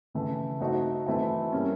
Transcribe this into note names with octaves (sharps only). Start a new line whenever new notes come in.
C#3 E3 A3
A3 C4 D#4 F#4
E3 A3 C4 E4
G3 A#3 C#4